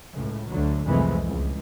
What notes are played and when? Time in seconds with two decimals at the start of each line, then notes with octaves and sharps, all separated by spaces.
0.13 C#2 A2
0.51 D2 D3 F#3
0.87 C2 F2 G#2 E3 G#3 A3
1.27 C#2